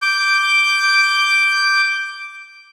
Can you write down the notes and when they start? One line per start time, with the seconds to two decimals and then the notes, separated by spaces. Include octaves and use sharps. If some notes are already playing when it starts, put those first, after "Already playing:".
0.02 D6 G6